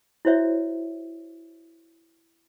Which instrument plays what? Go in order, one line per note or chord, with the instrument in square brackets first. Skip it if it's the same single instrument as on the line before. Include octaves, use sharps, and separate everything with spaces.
[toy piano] E4 F#4 C5 C#5 E5